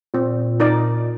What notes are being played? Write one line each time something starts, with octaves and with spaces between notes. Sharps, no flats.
A#2 C4
D#4 A#4 D5